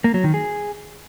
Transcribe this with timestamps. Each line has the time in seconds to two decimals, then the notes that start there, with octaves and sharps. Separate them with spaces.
0.04 A#3
0.14 F#3
0.24 D#3
0.34 G#4